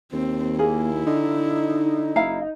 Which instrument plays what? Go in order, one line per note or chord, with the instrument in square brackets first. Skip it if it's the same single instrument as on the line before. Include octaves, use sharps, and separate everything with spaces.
[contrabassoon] D#2 [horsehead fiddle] C4
[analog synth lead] A#3 [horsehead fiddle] E4 [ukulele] G#4
[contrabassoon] D3 [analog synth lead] D#4
[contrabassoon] F#1 [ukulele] E4 F5 A#5